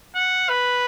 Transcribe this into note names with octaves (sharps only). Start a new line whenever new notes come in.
F#5
B4